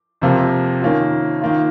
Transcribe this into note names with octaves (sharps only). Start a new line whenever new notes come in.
F2 C3 F3 A#3
D#3 A#3 C#4 F4
D#3 A#3 F4